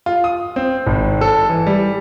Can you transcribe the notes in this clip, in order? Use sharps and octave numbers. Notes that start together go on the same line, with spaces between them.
F4
D#6
C4
G#1
A4
E3
G3